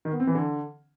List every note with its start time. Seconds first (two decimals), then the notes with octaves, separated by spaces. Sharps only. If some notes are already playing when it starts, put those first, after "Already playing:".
0.05 D#3
0.12 B3
0.20 C4
0.27 E3
0.35 D3